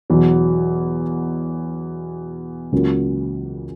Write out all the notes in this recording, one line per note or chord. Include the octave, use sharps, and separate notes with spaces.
E2 B2 F#3
C#2 C#3 F#3 A#3